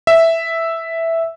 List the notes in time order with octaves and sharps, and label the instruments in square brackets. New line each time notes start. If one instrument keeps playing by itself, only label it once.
[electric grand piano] E5